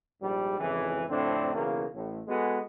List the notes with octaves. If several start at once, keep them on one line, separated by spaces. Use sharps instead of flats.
A#1 G#2 G3
G#1 F2 C#3 E3
F2 A2 D3 C4 D4
B1 C#3 E3 A#3
A1 A2
G#3 B3 F#4 G#4 A4